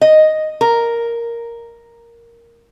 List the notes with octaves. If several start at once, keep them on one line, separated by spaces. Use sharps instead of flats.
D#5
A#4